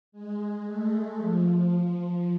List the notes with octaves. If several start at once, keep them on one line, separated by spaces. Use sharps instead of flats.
G#3
A3
F3